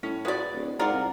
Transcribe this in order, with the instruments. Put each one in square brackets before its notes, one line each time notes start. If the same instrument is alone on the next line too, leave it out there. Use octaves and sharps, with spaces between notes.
[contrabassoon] A2 [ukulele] C#4
[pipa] G#3 D5 [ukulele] F#4 B4
[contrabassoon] D1
[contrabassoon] G#2 [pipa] F4 A#4 [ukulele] D5 F#5
[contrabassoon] C2